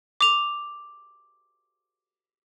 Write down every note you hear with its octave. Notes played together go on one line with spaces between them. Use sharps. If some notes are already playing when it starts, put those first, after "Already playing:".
D6 F7